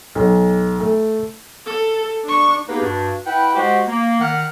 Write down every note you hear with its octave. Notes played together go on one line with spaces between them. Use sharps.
B1
A3
A4
D4 C#6
A#3 B3 D#4 G4 G#4 B4
G2 D4 F#4
E4 B4 F#5 G5
G#3 F#4 G4 C5 F#5
A#3
D#3 F#5 F6